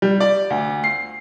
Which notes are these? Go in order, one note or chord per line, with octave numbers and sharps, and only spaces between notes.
G3
D5
D2
C7